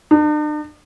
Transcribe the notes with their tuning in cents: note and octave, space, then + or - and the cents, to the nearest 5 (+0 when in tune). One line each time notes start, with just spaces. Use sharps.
D4 +45